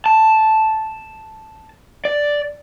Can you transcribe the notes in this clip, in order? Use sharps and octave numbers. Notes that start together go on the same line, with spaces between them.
A5
D5